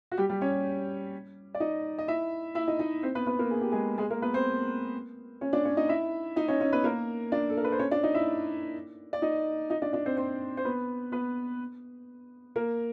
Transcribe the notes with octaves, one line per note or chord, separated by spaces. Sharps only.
F#4
G3 G4
G3 G4
C#4 C#5
D5
D#4 D#5
D#5
E4 E5
E4 E5
D#4 D#5
D#4 D#5
C4 C5
B3 B4
B3 B4
A#3 A#4
G#4
G4
G#3 G#4
G#3 G#4
A#3 A#4
B3 B4
C4 C5
C#4 C#5
D4 D5
C#4 C#5
D#4 D#5
E4 E5
D#4 D#5
C#4 C#5
C#4 C#5
B3 B4
A#3 A#4
D4 D5
A4
A#4
B4
C5
C#4 C#5
D4 D5
D#4 D#5
E4 E5
D5
D#4 D#5
D#4 D#5
D4 D5
D4 D5
C4 C5
C4 C5
C5
B3 B4
B3 B4
A#3 A#4